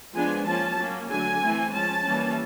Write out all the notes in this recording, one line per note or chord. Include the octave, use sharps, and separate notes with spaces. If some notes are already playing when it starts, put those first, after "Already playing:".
F3 G#3 B3 D4 G#5
F3 A#3 C#4 A5
F#3 A#3 C#4
D3 F#3 A3 G#5
E3 A3 C4
F3 G#3 C#4 A5
E3 G3 A#3 C#4